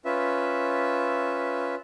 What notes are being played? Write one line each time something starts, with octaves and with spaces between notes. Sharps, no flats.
C#4 F4 B4 E5